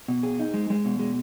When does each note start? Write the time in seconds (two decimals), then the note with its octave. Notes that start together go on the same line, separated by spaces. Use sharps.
0.08 B2
0.23 G#4
0.40 D#4
0.54 G#3
0.70 G#3
0.85 B2
0.99 G#3